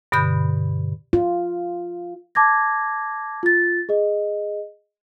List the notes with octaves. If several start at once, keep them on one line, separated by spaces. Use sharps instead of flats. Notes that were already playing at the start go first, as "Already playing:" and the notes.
G2 B2 D3 B5 G6
F4
A5 D6 G#6 A#6
F4 A6
G#4 D#5